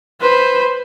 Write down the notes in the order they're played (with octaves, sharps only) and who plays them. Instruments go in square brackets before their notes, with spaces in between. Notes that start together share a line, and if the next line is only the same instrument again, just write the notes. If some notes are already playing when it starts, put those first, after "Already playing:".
[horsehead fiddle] B4 C5